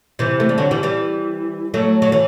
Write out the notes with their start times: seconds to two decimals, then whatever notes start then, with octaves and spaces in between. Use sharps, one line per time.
0.19 C3 E3
0.40 A3
0.49 G3
0.58 D3 F#3
0.71 E3 G3
0.83 E3 G3
1.74 F#3 A3
2.02 F#3
2.12 E3